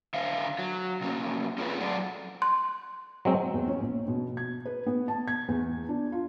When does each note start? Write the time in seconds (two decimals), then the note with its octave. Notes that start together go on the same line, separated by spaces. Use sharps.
0.14 D3 C5 E5 F5
0.58 F#3
1.01 C3 F#3 A#3 C#4
1.58 C4 F4 G#4 A4 B4 C#5
1.80 F#3 A4 C5 D5 F#5
2.42 C6
3.25 F#3 G#3 C4
3.54 E2
3.67 C#4
3.81 A#1
4.08 B2
4.37 G#6
4.65 B4
4.86 B3
5.08 A5
5.28 G#6
5.48 E2
5.89 D4
6.12 F4